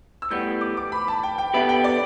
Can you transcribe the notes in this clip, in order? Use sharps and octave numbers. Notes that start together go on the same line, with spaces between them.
E6
A2 G3 B3 G6
D6
D6
B5
A5
G5
G5
D3 B3 G4 B4 E5
G5
D5